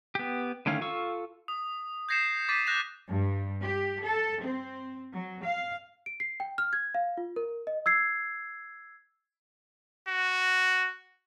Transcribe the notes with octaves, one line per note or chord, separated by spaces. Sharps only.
B3 G4
D3 D#3 A3 C#4 F5
F4 A4 F5 C#6 E6
D#6
G6 G#6 A#6 C7 C#7 E7
D6 A6 B6 C7 D#7
F#6 G6 A#6 C7 E7 F7
G2
G4
A4
C4
F#3
F5
D7
C7
G5
F6
G#6
F5
F4
A#4
D#5
E6 G#6 C7
F#4